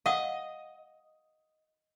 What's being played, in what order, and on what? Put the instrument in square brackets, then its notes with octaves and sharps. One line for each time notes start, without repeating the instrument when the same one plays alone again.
[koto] D#5 [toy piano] F5 F#5 D#6